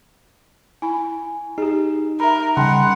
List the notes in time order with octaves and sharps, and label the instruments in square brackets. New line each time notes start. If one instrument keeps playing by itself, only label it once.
[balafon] E4 B5 [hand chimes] G#5
[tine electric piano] D#4 [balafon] G4 G#4
[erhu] A#4 [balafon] E5 B5
[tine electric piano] C#3 [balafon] G3 G5 A5 [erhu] F#5 [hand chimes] B5 C6